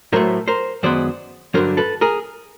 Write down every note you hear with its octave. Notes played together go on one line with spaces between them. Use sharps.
A2 F#3 A3 A#4 C5
A#4 C5
F#2 D#3 G#3 B3 C5 D5
G2 D3 F#3 A#4 C5
A4 B4
G#4 A#4